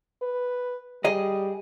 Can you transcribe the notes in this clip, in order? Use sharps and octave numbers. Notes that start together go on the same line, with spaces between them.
B4
G3 G#4 D#5